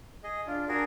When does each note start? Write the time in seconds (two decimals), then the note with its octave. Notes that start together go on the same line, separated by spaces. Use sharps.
0.23 G#4 D#5
0.47 D4 F4
0.68 D4 F#4 G#4 A#4